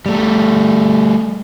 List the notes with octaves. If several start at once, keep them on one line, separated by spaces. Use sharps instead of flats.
G3 A3